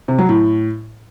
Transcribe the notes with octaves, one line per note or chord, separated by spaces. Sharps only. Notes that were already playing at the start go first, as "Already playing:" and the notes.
C3
F#3
A2